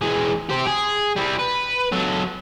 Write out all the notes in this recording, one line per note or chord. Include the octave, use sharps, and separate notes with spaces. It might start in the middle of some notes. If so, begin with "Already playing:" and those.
E3 G#3
G4 C5
G#4
G3 E4
B4
F#3 A4